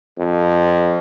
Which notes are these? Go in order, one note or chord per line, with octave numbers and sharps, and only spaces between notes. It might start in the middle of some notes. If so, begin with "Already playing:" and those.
F2